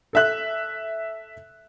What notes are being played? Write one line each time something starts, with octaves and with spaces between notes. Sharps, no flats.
A4 E5 F#6